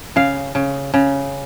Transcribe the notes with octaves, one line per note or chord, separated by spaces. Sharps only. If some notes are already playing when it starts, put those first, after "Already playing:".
C#3 F5
C#3
C#3